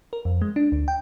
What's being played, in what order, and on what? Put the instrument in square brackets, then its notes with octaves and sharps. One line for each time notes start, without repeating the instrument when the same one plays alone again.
[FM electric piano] A#4
F2
G#3
D4
D2
G5